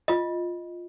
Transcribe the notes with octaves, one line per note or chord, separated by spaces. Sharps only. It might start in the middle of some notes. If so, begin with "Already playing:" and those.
F4 D#5